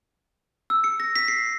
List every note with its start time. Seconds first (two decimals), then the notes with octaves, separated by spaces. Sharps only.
0.70 E6
0.84 C#7
1.00 A#6
1.16 B6
1.28 C7